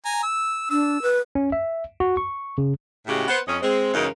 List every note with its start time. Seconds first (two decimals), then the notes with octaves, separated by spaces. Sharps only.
0.05 G#5 A#5
0.23 E6
0.70 D4 E6
1.02 B4
1.35 C#4
1.52 E5
2.00 F#4
2.17 C#6
2.58 C#3
3.07 A2 C#3 G#3 F#4 G4
3.28 B3 C5 F#5
3.48 F2 C#4 D#5
3.62 G#3 C4
3.94 F#2 C#3 E3 G#3 D#4 A#4